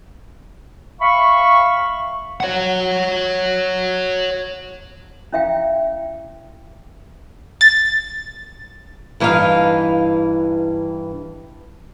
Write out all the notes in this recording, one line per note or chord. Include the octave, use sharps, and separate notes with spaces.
E5 F5 B5 C#6
C#5 F#5
C#4 E4 E5 F5 G5
A6
G2 E3 D#4 G4 F5